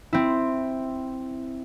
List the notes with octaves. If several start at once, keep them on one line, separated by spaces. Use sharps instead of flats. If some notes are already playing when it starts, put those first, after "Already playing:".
C4 E4